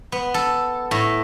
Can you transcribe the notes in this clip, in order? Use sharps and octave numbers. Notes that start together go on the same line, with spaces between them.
B3
A4
A2